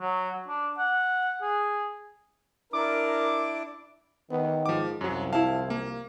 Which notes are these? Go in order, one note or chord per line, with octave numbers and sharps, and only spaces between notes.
F#3
D4
F#5
G#4
D4 E4 A#4 D6
D#3 B3
G#2 F3 D6
C2 F#2 F3 F#3
E4 F5 A5
A#3